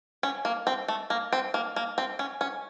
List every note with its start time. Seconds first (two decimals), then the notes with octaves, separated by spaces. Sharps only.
0.23 C#4
0.45 A#3
0.67 C4
0.88 A3
1.10 A#3
1.33 C4
1.54 A#3
1.76 A#3
1.98 C4
2.19 C#4
2.41 C#4